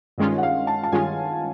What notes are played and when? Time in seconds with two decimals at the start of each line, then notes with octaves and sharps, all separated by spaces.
0.18 G2 D#3 G#3 C#4 F4
0.38 F#5
0.43 F5
0.67 A5
0.84 A5
0.92 G2 D#3 G#3 C#4 F4 G#5